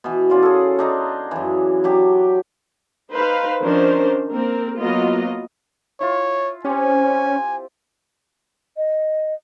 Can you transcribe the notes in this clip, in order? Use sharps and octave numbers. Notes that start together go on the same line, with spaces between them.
B2 E3
C#4 F4 D5
G#4 A4
D4 D#4 A#5
F#2 E3
F#3 D4 G4
D#4 B4 C5 F5
D#3 F3 C#4 D4 A#4 C5
A#3 C4 A#4
F#3 A#3 B3 F4 D#5
E4 F4 C#5
C4 C#4 G4 G#5
D#5